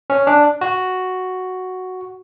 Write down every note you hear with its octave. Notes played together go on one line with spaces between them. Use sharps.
C#4
D4
F#4